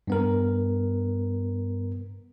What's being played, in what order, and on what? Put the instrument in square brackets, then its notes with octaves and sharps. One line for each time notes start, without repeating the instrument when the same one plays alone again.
[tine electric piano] G2 B3 A#4